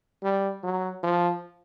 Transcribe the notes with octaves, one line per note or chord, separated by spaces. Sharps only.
G3
F#3
F3